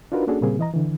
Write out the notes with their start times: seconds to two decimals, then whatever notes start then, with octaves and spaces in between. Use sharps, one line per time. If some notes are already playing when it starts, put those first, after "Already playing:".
0.12 D4 D#4 F4 F#4 A#4 B4
0.27 A#3 C#4 D4 F#4 G#4 A4
0.41 A#2 C#3 G3 A#3 C4 G#4
0.59 E3 D#5 A#5
0.74 D3 E3